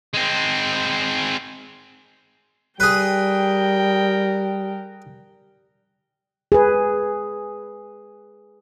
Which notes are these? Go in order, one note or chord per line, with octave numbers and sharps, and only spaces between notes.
G#3 C4
G3 G#4 A#4 B4 G5
G#4 B4